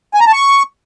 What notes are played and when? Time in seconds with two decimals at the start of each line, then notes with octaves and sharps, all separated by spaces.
0.14 G#5
0.20 A#5
0.27 A5
0.33 C#6